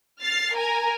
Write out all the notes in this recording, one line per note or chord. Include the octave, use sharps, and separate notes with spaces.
F6 A6 C7
A#4 G#5 A#5